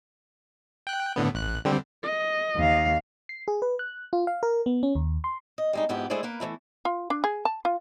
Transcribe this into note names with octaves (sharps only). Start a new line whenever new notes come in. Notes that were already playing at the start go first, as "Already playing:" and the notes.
G5 F#6
A2 D3 B3
A1 F#6
D3 G3 C4
D#5
D#2 F5
C7
G#4
B4
F#6
F4
F5
A#4
B3
C#4
D#2
C6
D#5
G3 G#3 D#4
F2 G#2 B3 E4 G4
G#3 A3 E4 G#4 C5 D5
A#3 A#4 B4
E3 F#3 A3 E4
F4
D4
G#4
A5
F4